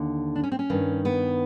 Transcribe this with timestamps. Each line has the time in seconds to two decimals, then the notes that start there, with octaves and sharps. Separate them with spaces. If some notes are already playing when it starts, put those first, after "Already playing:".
Already playing: D#2 D3
0.36 D4
0.44 C#4
0.52 C4
0.59 C#4
0.70 G2 D#3
1.05 B3